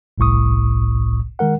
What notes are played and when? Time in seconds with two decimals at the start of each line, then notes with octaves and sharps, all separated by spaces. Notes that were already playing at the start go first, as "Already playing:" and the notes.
0.18 G1 C2 A2 C#6 D#6
1.39 D#3 G#3 A#4 F#5